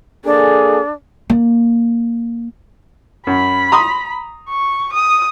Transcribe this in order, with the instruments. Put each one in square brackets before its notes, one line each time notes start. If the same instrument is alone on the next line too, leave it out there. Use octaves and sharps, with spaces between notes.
[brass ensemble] A#3 G#4 A4 [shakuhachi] D4
[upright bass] A#3
[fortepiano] F#2 [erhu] B5
[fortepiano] A#5 C6 D#6
[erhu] C#6
D#6